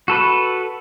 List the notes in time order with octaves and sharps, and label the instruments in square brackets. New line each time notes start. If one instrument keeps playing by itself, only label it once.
[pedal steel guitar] F#4 A4 B4